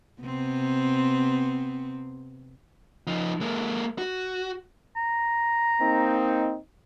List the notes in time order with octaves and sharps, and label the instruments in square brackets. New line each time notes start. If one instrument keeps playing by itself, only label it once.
[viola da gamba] C3 B3 C4
[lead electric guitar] F3 D#4
G#3 A#3
F#4
[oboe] A#5
[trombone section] A#3 C4 D#4